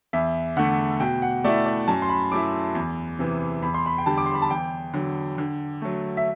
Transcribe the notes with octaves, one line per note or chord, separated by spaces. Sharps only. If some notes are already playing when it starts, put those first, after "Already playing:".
E2 E5
D3 A3 F#5
B2 G5
F#5
A3 E4 D5
D5
F#2 A5
C6
B5
F#3 A3 E4 D6
E2
C3 E3
E2 B5
C6
B5
G5
D3 G3 A5
D6
C6
B5
A5
E2 G5
D3 F#3
D3
F#3 A3
E5